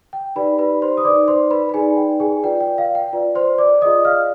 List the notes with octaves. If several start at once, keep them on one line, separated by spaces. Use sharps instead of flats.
G5
D#4 G4 B4 D5 B5
B4 B5
C5 C6
D#6
D#4 B4 D5 D6
C5 C6
B4 B5
B5
D#4 G#4 B4 D5 G#5
G5
G#4 G#5
F4 B4 D5 G5
G5
F5
G5
F4 B4 D5
C5 C6
D5 D6
F4 G#4 D5 D#5 D#6
F5 F6